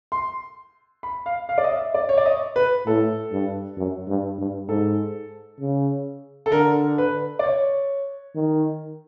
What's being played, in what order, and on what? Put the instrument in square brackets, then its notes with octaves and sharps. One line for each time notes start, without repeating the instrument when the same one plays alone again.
[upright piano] C6
B5
F5
F5
D5
D#5
E5
D5
C#5
D5
D#5
B4
[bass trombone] A2 [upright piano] A4
[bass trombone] G2
F#2
G2
G2
[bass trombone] G#2 [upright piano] A4
[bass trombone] C#3
[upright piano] A4
[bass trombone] D3 [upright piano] A#4
[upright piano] B4
D5
C#5
[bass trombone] D#3